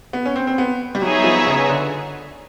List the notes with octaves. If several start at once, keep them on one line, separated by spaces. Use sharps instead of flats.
B3
C#4
C4
C4
B3
G3
F#3 B3 D#4 G#4 C#5 E5
F3
C#3
D3